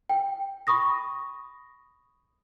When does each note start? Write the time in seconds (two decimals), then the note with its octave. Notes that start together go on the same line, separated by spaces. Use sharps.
0.09 G5
0.67 B5 C#6 D#6 A#6